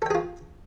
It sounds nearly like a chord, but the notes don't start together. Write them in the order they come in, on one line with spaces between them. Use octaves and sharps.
A4 G5 G#4 F4